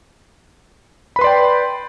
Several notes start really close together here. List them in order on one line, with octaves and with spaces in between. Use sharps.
B5 B4 C6 D5 G5